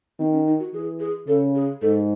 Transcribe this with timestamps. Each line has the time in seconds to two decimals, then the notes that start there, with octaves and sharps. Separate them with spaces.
0.19 D#3 C4
0.33 C#4
0.47 D#4
0.60 F#4
0.74 E3 G#4
1.00 G#4
1.27 C#3 A4
1.55 G#4
1.82 G#2 A4